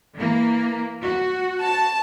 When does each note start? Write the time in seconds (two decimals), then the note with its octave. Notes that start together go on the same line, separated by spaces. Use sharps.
0.16 E3 A#3
1.02 F#4
1.63 A5